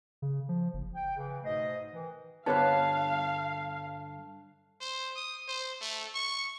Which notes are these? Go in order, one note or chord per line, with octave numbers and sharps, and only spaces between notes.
C#3
F3
F#1
G5
C#3 E3
G#2 B2 A3 C5 D#5
D#3 E3
G2 D3 B3 B4 C#5 F5 A5 F#6
C5
D#6
C5
A3
C#6